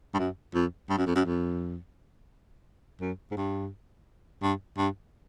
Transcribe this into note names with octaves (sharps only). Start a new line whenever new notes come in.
G2
F#2
F2
G2
F#2
F2
F#2
F2
F#2
G#2
G2
G2
G2